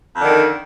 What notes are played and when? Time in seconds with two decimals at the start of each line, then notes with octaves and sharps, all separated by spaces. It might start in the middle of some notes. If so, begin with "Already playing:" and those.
0.16 F2
0.20 D3
0.24 D#3